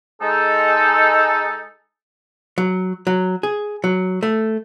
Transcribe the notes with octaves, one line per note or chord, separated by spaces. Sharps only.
G#3 D#4 A4
F#3
F#3
G#4
F#3
A3